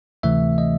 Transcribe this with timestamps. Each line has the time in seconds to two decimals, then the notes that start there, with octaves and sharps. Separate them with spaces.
0.23 D2 C3 E3 A3 E5
0.58 D#5